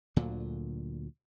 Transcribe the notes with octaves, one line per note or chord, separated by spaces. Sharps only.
D2 A#2 D3 F#3